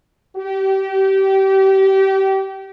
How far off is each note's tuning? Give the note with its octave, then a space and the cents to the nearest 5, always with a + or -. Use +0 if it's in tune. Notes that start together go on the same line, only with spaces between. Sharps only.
G4 -25